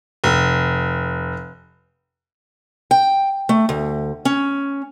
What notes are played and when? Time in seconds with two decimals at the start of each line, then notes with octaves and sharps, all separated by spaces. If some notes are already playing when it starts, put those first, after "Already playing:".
0.24 F1
2.91 G5
3.49 A3
3.69 D2
4.25 C#4